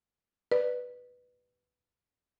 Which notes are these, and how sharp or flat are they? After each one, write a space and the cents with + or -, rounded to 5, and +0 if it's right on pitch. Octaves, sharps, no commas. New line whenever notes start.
B4 +0 D5 +15